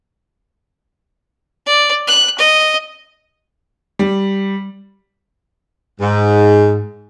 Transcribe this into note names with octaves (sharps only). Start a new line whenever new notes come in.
D5
F#6
D#5
G3
G#2